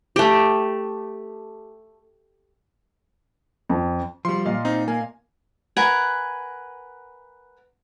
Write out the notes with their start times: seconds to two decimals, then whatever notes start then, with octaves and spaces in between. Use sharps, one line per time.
0.16 A3 G4
3.69 F2
4.25 F3 G3 C6
4.45 A#2 D#5 F5
4.65 C4 D#4
4.88 A#3 G#5
5.77 A#4 B4 F#5 G#5